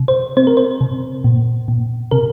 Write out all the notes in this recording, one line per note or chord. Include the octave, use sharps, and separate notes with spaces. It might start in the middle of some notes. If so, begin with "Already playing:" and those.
Already playing: C3
C5
C4 C5
A#4
C5
C3
A#2
A#2
C3 A#4